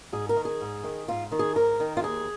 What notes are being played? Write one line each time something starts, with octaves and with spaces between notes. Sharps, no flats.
G#2 G#4
A#4
D#3
G#4
G#2
D#3
G#2 F4
D#3
G#4
G#2 A#4
D#3
F4
D#2 G#4